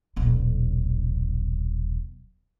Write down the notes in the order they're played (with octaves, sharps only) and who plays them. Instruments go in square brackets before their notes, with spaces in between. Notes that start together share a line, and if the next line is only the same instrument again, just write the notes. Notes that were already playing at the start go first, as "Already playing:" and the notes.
[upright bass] D#1 B1